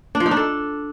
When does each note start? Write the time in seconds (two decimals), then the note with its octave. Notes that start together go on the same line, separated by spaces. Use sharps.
0.15 D4
0.20 F3
0.26 D#4
0.31 D4
0.37 A4